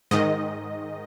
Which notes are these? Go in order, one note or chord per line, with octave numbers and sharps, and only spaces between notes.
G#2 D#3 D#5